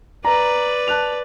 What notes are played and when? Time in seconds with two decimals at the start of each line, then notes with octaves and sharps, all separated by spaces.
0.25 B4 D5 A#5
0.88 A5 F#6 F7